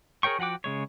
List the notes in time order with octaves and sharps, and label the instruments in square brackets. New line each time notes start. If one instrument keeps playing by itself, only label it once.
[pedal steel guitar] G#4 A#4 C#5 G5 C#6
F3 F#4 F#5 G5 D6
C#3 G#3 C#5